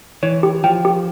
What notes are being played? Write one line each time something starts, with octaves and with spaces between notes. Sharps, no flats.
E3 C#5
G4
F3 G5
G4